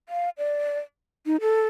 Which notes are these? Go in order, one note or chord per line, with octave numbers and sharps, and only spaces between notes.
F5
D5
D#4
A4